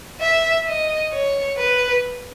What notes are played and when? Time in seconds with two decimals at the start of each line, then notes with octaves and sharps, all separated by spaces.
0.21 E5
0.67 D#5
1.13 C#5
1.58 B4